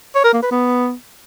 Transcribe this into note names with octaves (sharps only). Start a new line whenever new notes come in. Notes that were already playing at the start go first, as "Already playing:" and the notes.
C#5
A#4
A#3
B4
B3